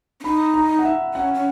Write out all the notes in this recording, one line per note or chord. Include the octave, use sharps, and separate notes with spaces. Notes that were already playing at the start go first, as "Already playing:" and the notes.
C#4
D#4 B5
A#5
F#5
E5
C#4 F#5
C#4